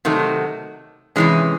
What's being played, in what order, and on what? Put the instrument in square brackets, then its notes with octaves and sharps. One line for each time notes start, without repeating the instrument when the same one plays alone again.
[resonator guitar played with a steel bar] C3 D#3 F#3 A3
C3 E3 G#3 C#4